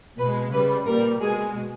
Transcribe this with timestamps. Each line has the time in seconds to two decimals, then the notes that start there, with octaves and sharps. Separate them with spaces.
0.19 B2 G#3 B4
0.53 C#3 G3 B4
0.87 A#2 G3 A#4
1.21 B2 G#3 G#4